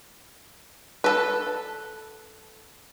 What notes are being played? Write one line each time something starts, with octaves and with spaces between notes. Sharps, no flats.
A4 B4